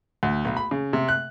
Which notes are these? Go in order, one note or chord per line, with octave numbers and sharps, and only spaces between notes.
D2
B1
B5
C#3
C3
F#6